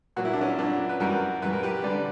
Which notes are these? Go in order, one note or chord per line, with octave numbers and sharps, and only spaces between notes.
A#2 F#3 F#4
E4
D4
C#4 E4
A#2 F#3 D4 F#4
B4
F#2 E3 G3 F#4 A#4
F#2 E3 G3 B4
A#4
G4 B4
D3 G3 B4 D5